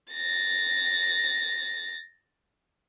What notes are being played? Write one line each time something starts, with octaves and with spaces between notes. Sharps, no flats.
A6 A#6